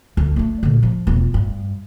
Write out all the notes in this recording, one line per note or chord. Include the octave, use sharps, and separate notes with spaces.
D2
A3 D4
A#2 D3
F3
E1 F4
G2